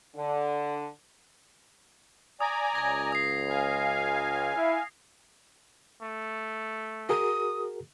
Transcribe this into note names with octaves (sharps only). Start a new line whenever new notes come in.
D3
D5 G#5 A#5 D#6
C#2 G#6 A#6
D#6 C7
F5 G#5
E4 E5
A3
F#4 G#4 A#4 D#6